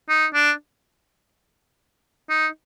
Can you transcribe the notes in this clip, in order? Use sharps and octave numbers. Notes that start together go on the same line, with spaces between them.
D#4
D4
D#4